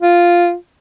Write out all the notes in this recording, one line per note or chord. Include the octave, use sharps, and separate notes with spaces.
F4